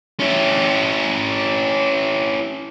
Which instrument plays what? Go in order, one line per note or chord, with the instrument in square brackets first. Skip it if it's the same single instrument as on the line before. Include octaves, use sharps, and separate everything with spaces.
[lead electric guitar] C#4 E4